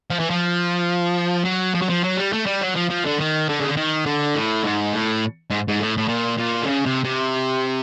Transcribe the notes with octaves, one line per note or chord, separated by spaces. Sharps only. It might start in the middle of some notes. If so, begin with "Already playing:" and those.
F3
E3
F3
F#3
F3
F#3
F3
F#3
G3
A3
G3
F#3
F3
F3
D3
D#3
D3
C#3
D3
D#3
D3
A2
G#2
A2
G#2
G#2
A2
A2
A#2
A#2
D3
C#3
C3
C3